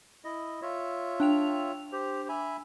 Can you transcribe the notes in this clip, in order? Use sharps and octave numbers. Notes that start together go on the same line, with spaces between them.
E4 D#5
F4 C#5 E5
D4 G5 F7
G4 C5
E5 G#5 B5